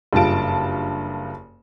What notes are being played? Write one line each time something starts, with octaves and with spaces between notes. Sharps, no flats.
F#1 G2 F4 A5 D7